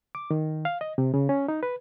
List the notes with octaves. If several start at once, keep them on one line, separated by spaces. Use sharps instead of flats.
D6
D#3
F5
D#5
C3
C#3
C#4
D#4
B4